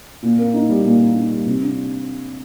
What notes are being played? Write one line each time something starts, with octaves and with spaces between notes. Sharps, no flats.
A#2
A#3
D#4
G3
A#2
A#3
D#4
G3
C3
D4